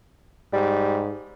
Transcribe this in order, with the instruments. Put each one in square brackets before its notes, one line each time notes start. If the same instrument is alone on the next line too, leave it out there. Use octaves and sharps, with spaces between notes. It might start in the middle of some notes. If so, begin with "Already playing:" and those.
[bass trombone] G#2 [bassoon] G3